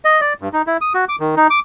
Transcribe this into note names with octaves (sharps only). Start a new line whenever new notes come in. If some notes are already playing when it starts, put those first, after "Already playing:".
D#5
D5
G2
D#4
E4
D#6
F#4
D6
D#3
D#4
D6